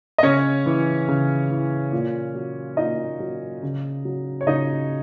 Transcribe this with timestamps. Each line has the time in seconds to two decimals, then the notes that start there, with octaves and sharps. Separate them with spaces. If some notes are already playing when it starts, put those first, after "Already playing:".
0.18 D#5
0.23 C#3 C#4 C#5
0.66 E3
1.08 C#3
1.50 E3
1.92 A#2
2.35 F#3
2.77 A#2 D#4 D#5
3.20 F#3
3.63 C#3
4.05 F#3
4.41 C#5
4.47 C#3 D#4 D#5